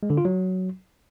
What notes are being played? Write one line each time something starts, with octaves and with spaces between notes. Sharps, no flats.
G#3
D3
F4
F#3